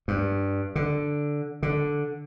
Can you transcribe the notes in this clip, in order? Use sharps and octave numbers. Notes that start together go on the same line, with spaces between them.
G2
D3
D3